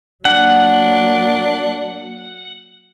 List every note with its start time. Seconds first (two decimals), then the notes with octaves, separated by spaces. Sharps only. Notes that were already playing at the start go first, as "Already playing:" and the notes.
0.25 F#3 A#3 D4 F#5